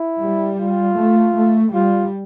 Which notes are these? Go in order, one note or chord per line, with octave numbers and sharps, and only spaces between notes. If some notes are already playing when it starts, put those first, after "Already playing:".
Already playing: E4
G3
F4
A3
A3
G3 F4